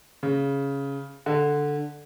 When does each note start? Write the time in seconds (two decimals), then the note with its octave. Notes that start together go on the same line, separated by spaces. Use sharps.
0.23 C#3
1.26 D3